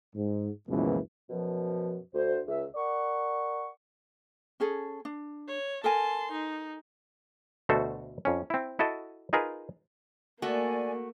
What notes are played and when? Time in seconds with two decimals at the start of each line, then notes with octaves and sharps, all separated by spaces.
0.15 G#2
0.68 F#1 C#2 F#2 B2 E3 F3
1.30 F#2 B2 F3
2.14 D2 C5
2.48 C#2 E5
2.75 A#4 D5 F#5 C#6
4.60 C#4 G#4 A4
5.05 D4
5.48 C#5
5.84 A4 A#4 G#5 A5 C6
6.32 D#4
7.69 D2 B2 A3 F#4 A4 C5
8.25 F2 C#4
8.50 C4 E4
8.79 E4 F#4 A4 D#5 A5
9.33 D#4 F4 G#4 A#4 B4
10.42 A3 A#3 F#4 D5 G#5